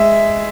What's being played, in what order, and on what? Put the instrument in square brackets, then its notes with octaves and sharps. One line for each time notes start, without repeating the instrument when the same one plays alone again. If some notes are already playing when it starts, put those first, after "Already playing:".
Already playing: [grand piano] G#3 E5